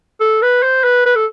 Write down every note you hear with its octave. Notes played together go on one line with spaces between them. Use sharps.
A4
B4
C5
B4
B4
A4